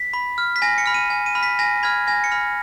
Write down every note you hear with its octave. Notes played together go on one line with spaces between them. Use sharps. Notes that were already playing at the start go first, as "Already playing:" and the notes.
Already playing: B6
B5
F6
B6
G#5 A#6
C#7
B5 F6
D#7
G#5
D#7
B5 F6
B6
G#5 A#6
B5 F6 G#6
G#5 A#6
C#7
B5 F6